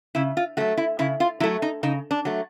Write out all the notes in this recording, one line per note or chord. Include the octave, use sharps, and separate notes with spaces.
C#3 E4
F4
F#3 A3 F#4
E4
C#3 E4
F4
F#3 A3 E4
D#4
C#3 D#4
D4
F#3 A3